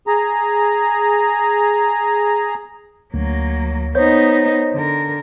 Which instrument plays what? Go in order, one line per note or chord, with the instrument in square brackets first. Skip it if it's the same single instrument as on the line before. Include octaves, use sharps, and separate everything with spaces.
[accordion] G#4 A#5
[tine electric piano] D2 [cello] F#3 A#3
[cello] B3 D#4 [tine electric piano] C5 C#5 G6
[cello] D3 A#4